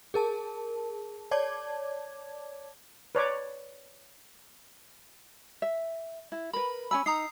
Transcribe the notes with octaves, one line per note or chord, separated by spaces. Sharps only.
G#4 A#4 A5
C#5 D5 A5 D6 G#6
B4 C#5 D5 D6
E5
E4
A#4 B4 B5
C#4 G#5 B5 E6
D#4 A#5 D#6 C7